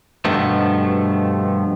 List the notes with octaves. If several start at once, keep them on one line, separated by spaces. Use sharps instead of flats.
G2 B2 D#3 F3 A3